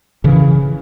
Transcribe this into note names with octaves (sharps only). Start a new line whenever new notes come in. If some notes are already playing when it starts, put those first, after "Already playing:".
C#3 E3